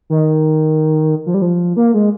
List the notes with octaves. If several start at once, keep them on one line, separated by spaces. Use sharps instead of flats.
D#3
F3
G3
F3
A#3
G#3